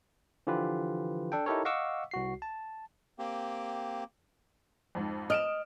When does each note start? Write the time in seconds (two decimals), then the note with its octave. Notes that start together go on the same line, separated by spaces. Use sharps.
0.47 D3 E3 F3 F4 G4 B4
1.32 D4 A4 G5
1.46 D#4 E4 G4 A4 A#4 C#5
1.65 D#5 F5 F#5 C#6 D6 E6
2.11 C2 F#4 C7
2.42 A5
3.19 A#3 C4 G4
4.95 F2 G#2
5.30 D#5 F6 D7 E7